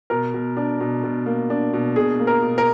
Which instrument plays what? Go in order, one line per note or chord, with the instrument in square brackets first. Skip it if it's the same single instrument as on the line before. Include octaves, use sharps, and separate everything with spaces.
[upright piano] B2 [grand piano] A#4
[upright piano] B2
D4
B2
B2
A#3
D4
B2
[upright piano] B2 [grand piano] G#4
[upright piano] A#3
[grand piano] A#4
[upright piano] B2
[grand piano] A#4